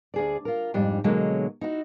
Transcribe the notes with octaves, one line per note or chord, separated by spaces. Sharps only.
D2 G#4 D5
F4 A#4
F2 G#2 G3 D4
B2 D3 F#3 G#3 A#3 C#5
D#4 E4 F#4